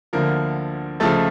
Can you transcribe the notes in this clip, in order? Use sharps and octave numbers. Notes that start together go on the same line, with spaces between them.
D2 D3 F3 A#3 A#4
C#2 C#3 F3 A3 A4